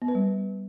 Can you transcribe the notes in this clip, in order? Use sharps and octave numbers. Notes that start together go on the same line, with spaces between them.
B3
B4
G3